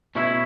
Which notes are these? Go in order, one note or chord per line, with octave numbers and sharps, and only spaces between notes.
B2 A3 C#4 E4